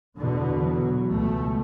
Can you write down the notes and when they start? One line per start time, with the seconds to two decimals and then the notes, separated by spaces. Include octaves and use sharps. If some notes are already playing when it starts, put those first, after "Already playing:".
0.17 E2 B2 D3
0.64 F#3
1.10 C#2 B2 A3